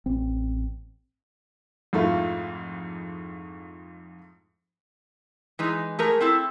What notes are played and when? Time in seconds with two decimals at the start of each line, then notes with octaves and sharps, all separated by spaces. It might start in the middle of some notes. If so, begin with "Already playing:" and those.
0.06 A1 C4
1.93 F2 G#2 A3 E4 F4
5.59 E3 G#3 D#4
5.99 A3 G#4 A#4
6.21 C4 E4 A4